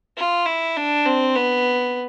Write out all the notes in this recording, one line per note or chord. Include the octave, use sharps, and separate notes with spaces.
F4
E4
D4
C4
B3